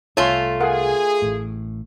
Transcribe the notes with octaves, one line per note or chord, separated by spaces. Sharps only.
C2 A3 F4 C#5 G#5 C6
G#4 A#4 F5 F#5
A1 A2